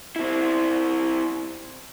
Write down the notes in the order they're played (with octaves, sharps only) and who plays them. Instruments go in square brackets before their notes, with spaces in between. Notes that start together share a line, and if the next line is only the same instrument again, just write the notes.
[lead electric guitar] C4 E4